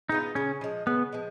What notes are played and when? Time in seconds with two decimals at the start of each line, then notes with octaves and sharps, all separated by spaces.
0.09 G#3 B3 D#4 F4
0.35 C#3 C#4
0.61 F3 G#3
0.87 C#3 B3
1.12 F3 G#3